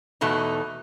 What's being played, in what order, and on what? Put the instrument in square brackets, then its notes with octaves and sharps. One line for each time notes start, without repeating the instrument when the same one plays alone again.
[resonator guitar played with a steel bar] E2 B2 A3 D#4